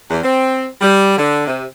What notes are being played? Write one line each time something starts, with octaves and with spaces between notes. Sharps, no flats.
E2
C4
G3
D3
C3